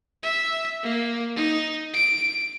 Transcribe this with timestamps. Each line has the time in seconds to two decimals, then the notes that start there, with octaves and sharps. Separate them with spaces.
0.23 E5
0.83 A#3
1.36 D#4
1.94 D7